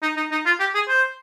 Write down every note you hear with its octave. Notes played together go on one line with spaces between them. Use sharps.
D#4
D#4
D#4
F4
G4
G#4
C5